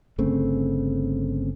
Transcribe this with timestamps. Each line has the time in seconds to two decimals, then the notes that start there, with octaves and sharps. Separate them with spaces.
0.18 G1 C#3 A3 C4